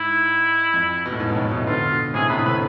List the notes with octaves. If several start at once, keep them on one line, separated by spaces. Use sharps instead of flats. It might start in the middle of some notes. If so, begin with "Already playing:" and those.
Already playing: G#2 E4
F2
B2
A2
G#2
B2
F2 A2
G#2 B2
B2 D3 F4
A2 C3 G#4
A2 C3 B4
D3
A2 C3 B4